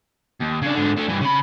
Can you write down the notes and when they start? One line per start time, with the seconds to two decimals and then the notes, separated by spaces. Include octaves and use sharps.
0.41 D#2
0.63 C#3 D4
0.76 G#2 D3
0.98 A3 D4
1.09 G2 E3
1.21 C#3 B5